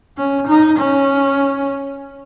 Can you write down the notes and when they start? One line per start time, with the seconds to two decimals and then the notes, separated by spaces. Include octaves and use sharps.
0.17 C#4
0.47 D#4
0.79 C#4